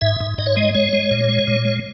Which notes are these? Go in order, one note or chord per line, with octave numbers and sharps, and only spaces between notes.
G#2 E5
G#2
G#2 D#5
C#5
G#3 D#5
G#3 C#5
G#3
A#2
G#3
A#2
G#3